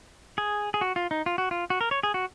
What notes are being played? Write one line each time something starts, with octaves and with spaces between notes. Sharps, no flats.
G#4
G#4
F#4
F4
D#4
F4
F#4
F4
F#4
A#4
C#5
G#4
F#4